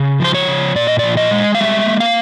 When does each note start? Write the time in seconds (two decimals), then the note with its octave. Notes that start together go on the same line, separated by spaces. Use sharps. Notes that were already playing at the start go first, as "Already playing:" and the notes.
Already playing: C#3
0.20 F3 C5
0.34 C#5
0.48 C#3
0.76 A#2 D5
0.87 D#5
0.99 F3 D5
1.17 D#5
1.31 G#3
1.55 F5
1.58 G3 E5
1.86 A#3
2.00 F5